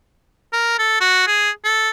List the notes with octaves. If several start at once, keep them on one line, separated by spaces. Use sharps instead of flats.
A#4
A4
F#4
G#4
A4